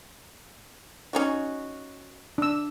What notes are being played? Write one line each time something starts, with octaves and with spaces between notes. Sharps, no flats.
C#4 D#4 F#4
D4 E6